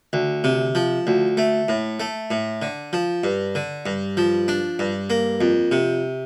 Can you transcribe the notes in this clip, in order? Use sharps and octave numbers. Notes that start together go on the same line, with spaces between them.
D2
C3
F3
D2
A3
A2
A3
A2
D3
F3
G2
D3
G2
F3
D4
G2
A#3
F2
C3